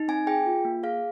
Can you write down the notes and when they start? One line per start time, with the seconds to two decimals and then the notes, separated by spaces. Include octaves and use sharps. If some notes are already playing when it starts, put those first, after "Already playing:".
Already playing: D#4
0.08 C4 G#5
0.27 G#4 G5
0.46 F4
0.65 A#3
0.83 G#4 F5